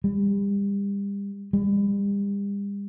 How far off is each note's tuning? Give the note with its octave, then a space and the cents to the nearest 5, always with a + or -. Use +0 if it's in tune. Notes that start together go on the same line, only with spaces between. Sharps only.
G3 +35
G3 +40